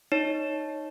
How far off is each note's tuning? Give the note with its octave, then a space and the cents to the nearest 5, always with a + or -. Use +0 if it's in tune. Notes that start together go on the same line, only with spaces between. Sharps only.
D#4 +0 C#5 +0